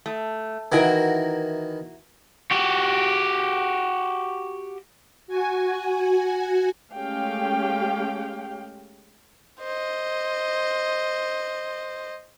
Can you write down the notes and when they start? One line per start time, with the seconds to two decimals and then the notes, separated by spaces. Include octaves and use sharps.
0.06 A3
0.72 D#3 E3 E4 F#4 A#4 G#5
2.51 F#4 G4
5.27 F#4 G#5
6.93 G#3 A3 C#4 G4 F5 G5
9.60 C5 D#5